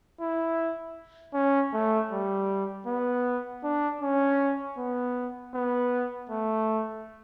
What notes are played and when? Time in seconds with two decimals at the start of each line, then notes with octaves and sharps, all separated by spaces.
0.21 E4
1.34 C#4
1.73 A3
2.11 G3
2.87 B3
3.64 D4
4.01 C#4
4.78 B3
5.54 B3
6.30 A3